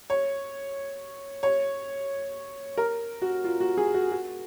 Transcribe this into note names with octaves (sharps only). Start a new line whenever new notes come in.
C#5
C#5
A#4
F#4
F4
F#4
G#4
F#4
F#4